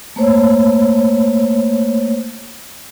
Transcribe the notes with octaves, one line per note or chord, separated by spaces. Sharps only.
A3 A#3 C5 C#5